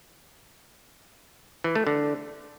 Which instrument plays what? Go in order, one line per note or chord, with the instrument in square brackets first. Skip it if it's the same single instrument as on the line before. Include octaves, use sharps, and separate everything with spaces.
[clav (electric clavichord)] E3
A3
D3